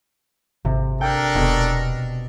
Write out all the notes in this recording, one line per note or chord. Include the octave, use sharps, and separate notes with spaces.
G#1 C3
D4 A4 A#4 G5 G6
E1 B2